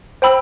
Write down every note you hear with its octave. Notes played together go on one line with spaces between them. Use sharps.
C5 G5 B5 E6